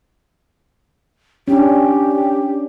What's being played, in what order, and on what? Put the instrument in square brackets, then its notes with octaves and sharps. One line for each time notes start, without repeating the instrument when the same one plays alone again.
[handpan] C#4 D4 [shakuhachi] G4